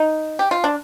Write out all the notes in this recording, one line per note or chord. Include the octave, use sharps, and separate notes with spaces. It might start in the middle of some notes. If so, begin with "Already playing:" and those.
Already playing: D#4
G4
F4
D4